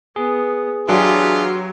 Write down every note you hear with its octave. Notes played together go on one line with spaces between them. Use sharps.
B3 G#4
E3 F#3 D4 F4 G4 G#4 F#5 C6